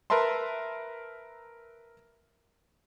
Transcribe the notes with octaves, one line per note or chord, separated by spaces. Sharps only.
A#4 B4 E5 A5 C6